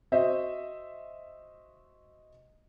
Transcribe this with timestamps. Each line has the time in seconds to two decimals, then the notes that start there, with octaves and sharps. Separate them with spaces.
0.12 F#4 C5 D#5 E5